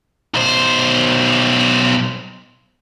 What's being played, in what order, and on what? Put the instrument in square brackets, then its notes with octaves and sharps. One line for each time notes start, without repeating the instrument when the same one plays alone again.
[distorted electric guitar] B1 C5